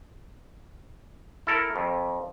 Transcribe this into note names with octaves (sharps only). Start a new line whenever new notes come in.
E4 A4 A#4
F2